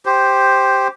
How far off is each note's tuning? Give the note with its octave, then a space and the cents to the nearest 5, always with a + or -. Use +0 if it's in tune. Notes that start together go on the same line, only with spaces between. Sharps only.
G4 +0 C5 +0